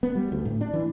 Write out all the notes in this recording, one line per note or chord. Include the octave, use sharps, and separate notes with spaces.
B3
G3
D2
A2
D4
E3